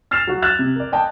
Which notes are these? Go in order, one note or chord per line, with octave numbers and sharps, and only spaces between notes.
F6 A6 C7 E7 F7
F#3 F#4
F#6 G#6 A6 E7 F7
C3
A#4 D5
D5 D#5 G5 A5